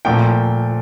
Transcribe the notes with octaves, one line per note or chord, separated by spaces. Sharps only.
A#2 F3 A3 C4 G5